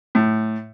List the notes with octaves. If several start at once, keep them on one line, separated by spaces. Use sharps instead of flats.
A2